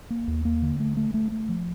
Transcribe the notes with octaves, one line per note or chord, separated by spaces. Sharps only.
A#3
D#2
A#3
D3
A3
A3
A3
A3
F3